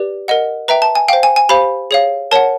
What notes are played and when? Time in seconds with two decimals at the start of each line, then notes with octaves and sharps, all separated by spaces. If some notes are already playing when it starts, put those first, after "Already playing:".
Already playing: G4 B4 D5
0.28 A#4 D#5 F#5
0.68 B4 E5 G5 A#5
0.82 A5
0.95 G#5
1.08 C5 F5 G5
1.23 G#5
1.36 G#5
1.49 G4 C5 F5 B5
1.91 G#4 C#5 F5
2.31 A#4 C#5 F#5 A5